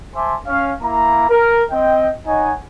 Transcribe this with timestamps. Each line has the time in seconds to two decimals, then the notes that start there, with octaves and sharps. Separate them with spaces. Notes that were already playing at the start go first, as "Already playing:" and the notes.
0.15 C5 E5 G#5 A5 C6 D6
0.47 C#4 F5
0.82 A#3 E4 A#5
1.29 A#4
1.71 C4 D#5 G5
2.26 D#4 C#5 D#5 F#5 G#5